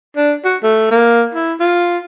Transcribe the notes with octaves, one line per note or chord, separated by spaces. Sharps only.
D4
F#4
A3
A#3
E4
F4